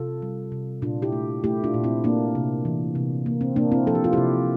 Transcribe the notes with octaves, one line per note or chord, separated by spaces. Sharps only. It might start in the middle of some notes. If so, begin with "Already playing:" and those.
Already playing: C3 F4 A4
G3
C3
A#2 D4 F4
E4 G4
A3
A3 E4 G4
D4 F4
A#2
C4 E4
A#3 D4
C3
E3
C3
A#3
C4
C3 A#3 D4
C4 E4
F3 A4
G4
F4
C3 E4 G4